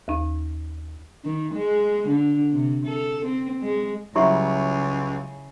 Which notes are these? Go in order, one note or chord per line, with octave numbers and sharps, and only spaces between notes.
D#2 D#4
D#3
G#3
D3
C3
A4
C4
G#3
C#2 C#3 F#3 G3 E4 E5 C6 C#6